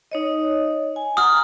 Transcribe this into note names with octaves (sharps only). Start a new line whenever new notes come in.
D#4 C#5 D#5
G#5
F#5 A#5 D#6 F6